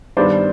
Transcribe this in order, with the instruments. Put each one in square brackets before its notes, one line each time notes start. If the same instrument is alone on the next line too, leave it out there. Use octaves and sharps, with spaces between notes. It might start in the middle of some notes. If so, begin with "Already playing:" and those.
[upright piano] G2 D#3 G3 B3 D4 C5 D5